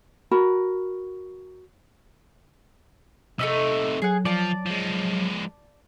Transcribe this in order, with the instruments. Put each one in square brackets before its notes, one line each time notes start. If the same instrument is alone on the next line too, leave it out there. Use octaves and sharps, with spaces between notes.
[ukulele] F#4 A#4 B5
[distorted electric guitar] C3 D#4 [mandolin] A3 E4 E6 [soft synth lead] D#5
[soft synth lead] F#3 [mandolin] G#4 F#5
[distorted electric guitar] F3 [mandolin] D5 A5
[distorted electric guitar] F3 G#3